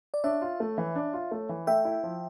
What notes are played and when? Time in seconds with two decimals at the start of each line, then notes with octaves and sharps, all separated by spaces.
0.14 D5
0.24 D4 C#5 E5
0.42 F4
0.60 A3
0.78 E3
0.95 D4
1.13 F4
1.31 A3
1.49 E3
1.67 A3 E5 G5
1.85 E4
2.03 F3